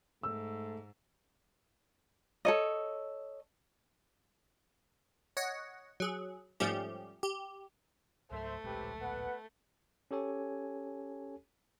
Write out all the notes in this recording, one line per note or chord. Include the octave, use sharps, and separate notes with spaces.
G#2 A3 E6
A4 C#5 D#5
C#5 D#5 F#5
F#3 G#4
G#2 F3 G3 A3 C#4 G4
G4
C#2 G#2 F#3 A3 C5 E5
D1 A#1 G#3 C4 G4 B4
B3 B4 F#5
C#4 G4 A4 C#5 G#5